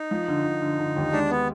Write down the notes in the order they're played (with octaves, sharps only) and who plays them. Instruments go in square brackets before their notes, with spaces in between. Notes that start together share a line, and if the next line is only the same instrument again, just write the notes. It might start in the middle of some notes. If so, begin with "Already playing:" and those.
Already playing: [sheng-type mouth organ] D#4
[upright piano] F3
D3
D3
D3
D3
D#2
[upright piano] G#3 [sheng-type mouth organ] D4
[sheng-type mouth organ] B3